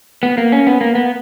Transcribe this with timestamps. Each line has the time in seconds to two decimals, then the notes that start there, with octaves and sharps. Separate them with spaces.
0.23 B3
0.38 A#3
0.52 C#4
0.67 B3
0.81 A#3
0.95 B3